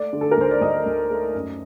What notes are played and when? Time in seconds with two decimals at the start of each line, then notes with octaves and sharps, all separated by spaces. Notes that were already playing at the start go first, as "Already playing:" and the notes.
Already playing: A3 D5
0.13 D3
0.21 A4
0.31 A#4
0.37 D2 C5
0.51 D5
0.61 D2 D#5
0.86 D2
1.10 A3
1.34 F#2